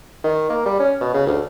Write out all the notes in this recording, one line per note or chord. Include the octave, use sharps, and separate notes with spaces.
D#3
A#3
G3
C#4
B2
C#3
D2